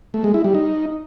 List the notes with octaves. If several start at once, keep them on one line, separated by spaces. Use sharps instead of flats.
A3
G#3
E4
G3
D#4